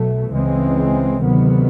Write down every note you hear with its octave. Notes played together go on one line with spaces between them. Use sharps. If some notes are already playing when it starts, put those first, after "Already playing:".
Already playing: B1 B2 F#3 A3
C#2 C#3 E3 G#3 C4
D2 C3 D#3 F#3 B3